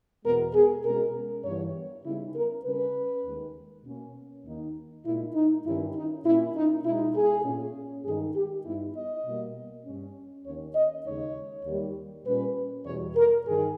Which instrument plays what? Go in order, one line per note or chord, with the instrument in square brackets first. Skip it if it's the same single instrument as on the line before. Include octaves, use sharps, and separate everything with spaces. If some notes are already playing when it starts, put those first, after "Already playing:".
[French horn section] E2 B2 G#3 B3 A#4
G#4
B2 G#3 C#4 A#4
G2 E3 G3 B3 C#5
C#3 G3 B3 D#4 E4
A#4
C#3 G3 C#4 B4
D#2 D#3 G#3
B2 A#3 C#4
D#2 D#3 A#3 D#4
A#2 G#3 D#4 E4
D#4
G2 D#3 G3 C#4 E4
D#4
A#2 A#3 C#4 E4
D#4
B2 G#3 D#4 E4
G#4
A#2 A#3 C#4
G2 D#3 G#3 D#4 G#4
G4
G2 G3 B3 D#4 E4
D#5
B2 G3 A#3
G2 G3 C#4
D#2 D#3 A#3 C#4 C#5
D#5
D#2 C#3 G#3 D#4 C#5
D#2 D#3 G3
A#2 G3 C#4 B4
E2 B2 G3 C#5
A#4
G2 D#3 G#4